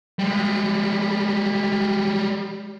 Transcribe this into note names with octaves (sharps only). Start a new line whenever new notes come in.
G3 G#3